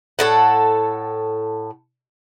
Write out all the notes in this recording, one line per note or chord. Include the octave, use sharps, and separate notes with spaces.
A2 A4 F#5